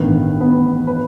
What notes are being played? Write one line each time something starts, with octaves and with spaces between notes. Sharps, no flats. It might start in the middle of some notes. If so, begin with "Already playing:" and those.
Already playing: A1 G2 D#3 B3 B4
B3 B4
B4